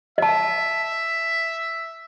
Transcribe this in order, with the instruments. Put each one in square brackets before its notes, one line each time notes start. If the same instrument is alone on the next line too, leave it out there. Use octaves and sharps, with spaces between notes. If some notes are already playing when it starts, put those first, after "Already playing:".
[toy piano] D#5 A5 [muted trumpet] E5